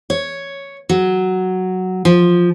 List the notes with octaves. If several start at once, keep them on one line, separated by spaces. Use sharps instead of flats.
C#5
F#3
F3